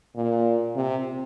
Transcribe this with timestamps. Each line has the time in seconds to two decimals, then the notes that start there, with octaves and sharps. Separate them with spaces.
0.15 A#2
0.75 C3